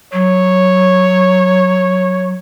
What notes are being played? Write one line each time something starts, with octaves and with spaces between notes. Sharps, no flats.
F#3 C#5